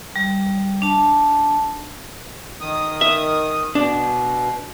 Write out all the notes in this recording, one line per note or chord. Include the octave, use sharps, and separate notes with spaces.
G3
D4 A5
D#3 D#6
E5
B2 D4